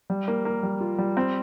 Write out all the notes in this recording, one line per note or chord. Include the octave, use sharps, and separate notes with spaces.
G3
A#3
A#3
G3
F4
G3
C4